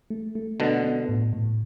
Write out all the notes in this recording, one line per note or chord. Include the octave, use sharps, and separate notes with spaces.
A3
A3
B2 D3 B3
B3
A2
A2